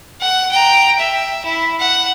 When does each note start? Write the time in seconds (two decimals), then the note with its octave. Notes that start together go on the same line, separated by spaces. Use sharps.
0.21 F#5
0.51 G5 A#5
0.99 E5
1.45 E4
1.80 F#5